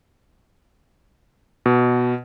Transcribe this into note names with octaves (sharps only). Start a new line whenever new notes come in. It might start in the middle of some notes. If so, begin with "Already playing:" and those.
B2